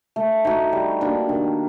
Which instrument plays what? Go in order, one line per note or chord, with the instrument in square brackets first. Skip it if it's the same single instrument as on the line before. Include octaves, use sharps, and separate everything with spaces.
[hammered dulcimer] A3
D#4 F#4
G3
A#3 D4 F#4
D#3